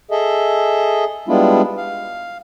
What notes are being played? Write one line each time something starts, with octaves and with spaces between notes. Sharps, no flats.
G#4 A4 D#5 E5
G3 G#3 B3 D4 E4 F4
F5